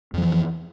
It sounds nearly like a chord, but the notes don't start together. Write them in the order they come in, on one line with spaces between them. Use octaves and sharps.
F2 F3 E3